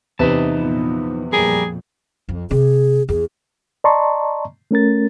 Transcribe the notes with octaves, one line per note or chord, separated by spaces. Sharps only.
E2 C3 D#4 B4 E5 A5
A#2 F3 B3
F2 A#2 G3 G#4 A#4
F2
C3 G#4
E2 G#4
D5 D#5 A5 A#5 C6 C#6
A3 C#4 A#4 A6